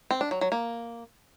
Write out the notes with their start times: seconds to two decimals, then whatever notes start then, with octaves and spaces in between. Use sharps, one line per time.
0.10 C4
0.21 D4
0.31 F#3
0.41 F#3
0.52 A#3